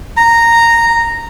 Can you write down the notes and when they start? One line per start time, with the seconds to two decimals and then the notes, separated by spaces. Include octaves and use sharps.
0.17 A#5